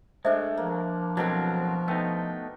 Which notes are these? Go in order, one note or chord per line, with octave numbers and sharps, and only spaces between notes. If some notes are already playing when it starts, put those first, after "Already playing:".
G#3 A3 D4 C5 D#5 E5
F3 A#3
B2 F#3 A3 C4 E4 A#4
A3 B3 D#4 G5 E6